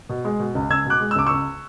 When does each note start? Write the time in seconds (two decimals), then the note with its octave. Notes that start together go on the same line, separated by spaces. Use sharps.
0.09 B2
0.25 G#3
0.40 B2
0.55 C#2
0.70 C#2 E6 G#6
0.86 B2 D6 F#6
1.00 G#3
1.11 E6
1.16 C#2 D6
1.27 C#2 C#6 E6